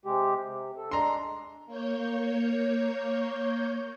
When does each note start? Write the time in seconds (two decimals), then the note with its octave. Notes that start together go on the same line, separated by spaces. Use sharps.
0.05 C3 G#3 G4
0.47 C3
0.77 A4
0.91 G#3 D4 A#5 C6
1.66 A#3 C#5 G6